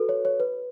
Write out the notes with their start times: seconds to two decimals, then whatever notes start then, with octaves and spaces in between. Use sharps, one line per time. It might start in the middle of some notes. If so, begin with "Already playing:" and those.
Already playing: F#4 A4 B4
0.09 C#5
0.25 C#5
0.40 B4